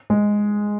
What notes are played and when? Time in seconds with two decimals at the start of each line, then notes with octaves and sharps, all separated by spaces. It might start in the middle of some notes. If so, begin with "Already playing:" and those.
0.10 G#3